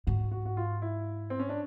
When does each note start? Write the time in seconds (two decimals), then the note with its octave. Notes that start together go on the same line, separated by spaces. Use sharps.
0.07 G#2 F#4
0.31 F#4
0.46 F#4
0.57 F4
0.82 E4
1.30 C4
1.40 C#4
1.49 D4